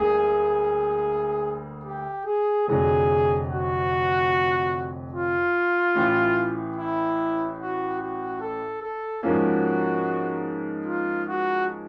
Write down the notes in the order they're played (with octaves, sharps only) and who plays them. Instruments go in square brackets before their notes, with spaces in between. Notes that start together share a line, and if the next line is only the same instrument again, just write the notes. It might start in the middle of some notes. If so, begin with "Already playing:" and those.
Already playing: [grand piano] D2 D3 G3 A#3 [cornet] G#4
[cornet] G4
G#4
[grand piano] F1 F2 D3 F#3 [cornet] G#4
[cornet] F#4
F4
[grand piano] A1 A2 E3
[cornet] E4
F#4
F#4
A4
A4
[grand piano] G#2 F3 A#3 C#4 [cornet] F#4
[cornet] F4
F#4